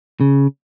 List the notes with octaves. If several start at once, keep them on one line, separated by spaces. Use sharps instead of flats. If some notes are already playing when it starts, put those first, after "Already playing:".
C#3